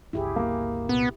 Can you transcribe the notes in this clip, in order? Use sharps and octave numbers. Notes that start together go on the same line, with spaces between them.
G1 C#2 E4 G4 G#4
A#3
C2 A#2 B3